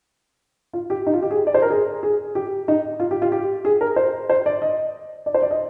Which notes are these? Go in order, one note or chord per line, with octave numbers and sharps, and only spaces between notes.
F4
G4
D#4
F4
G4
G#4
D5
C5
A#4
G#4
G#4
G4
D#4
F4
G4
F4
G4
G#4
A#4
C5
C5
D5
D#5
D5
C5
D5
D#5